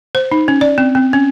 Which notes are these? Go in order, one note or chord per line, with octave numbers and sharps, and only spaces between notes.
C5
D#4
C#4
D5
C4
C4
C#4